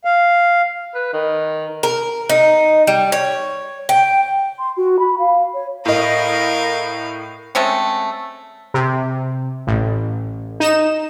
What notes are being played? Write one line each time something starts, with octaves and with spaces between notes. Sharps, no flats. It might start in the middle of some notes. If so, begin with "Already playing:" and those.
F5
B4
D#3
A#4
D#4
G3
C#5
G5
C6
F#4
B5
F5
C#5
A2 A#4 D#5 F5
G#3 A3 C4 C#4
C3
A1
D#4 E7